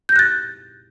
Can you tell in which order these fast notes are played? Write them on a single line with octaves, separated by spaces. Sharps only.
G6 A#6 F#6 A6